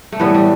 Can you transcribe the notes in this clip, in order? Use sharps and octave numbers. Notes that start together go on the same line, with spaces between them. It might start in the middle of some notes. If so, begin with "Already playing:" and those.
A3
A2 E3 G3 B3
G3